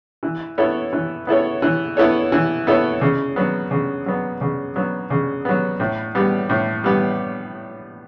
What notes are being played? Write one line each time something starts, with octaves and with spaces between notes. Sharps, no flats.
E3
B3 E4 A4 C#5
E3
B3 E4 A4 C#5
E3
B3 E4 A4 C#5
E3
B3 E4 A4 C#5
C#3
F#3 B3
C#3
F#3 B3
C#3
F#3 B3
C#3
F#3 B3
A2
G3 B3
A2
G3 B3